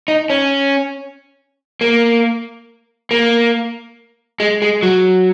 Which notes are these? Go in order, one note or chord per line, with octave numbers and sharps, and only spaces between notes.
D#4
C#4
A#3
A#3
G#3
G#3
F#3